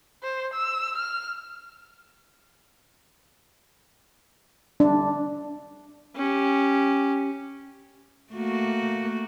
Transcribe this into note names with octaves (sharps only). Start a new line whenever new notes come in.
C5
E6
F6
D4
C#4 G4
A3 A#3 F#4